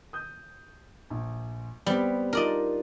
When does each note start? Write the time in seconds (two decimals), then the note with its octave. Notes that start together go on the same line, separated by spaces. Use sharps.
0.13 D#6 G6
1.10 A#1
1.86 G3 B3 C4 G4
2.33 D4 D#4 F4 A#4 D5 D#5